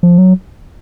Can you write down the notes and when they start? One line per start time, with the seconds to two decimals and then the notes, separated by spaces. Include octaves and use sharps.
0.03 F3
0.18 F#3